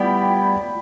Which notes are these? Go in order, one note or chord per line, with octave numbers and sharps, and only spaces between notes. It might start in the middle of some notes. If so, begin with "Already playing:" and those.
Already playing: G3 B3 E4 G4 D5 G5 B5